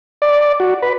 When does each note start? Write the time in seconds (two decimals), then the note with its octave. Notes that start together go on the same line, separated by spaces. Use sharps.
0.22 D5
0.60 F#4
0.82 B4